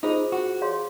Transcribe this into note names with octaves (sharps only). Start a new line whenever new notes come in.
D#4 F4 G#4 C5
F#4
G#4 C#5 F5 C6